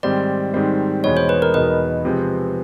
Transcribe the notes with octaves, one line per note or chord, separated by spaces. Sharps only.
G#2 D#3 G3 C4 D5
G#2 D#3 G3 C4
E2 B2 G#3 B3 D#4 C#5
C5
B4
A#4
E2 B2 G#3 B3 D#4 B4
C3 F3 G#3 C4